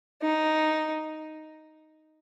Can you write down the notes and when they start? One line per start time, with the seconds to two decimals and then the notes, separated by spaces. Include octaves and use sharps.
0.22 D#4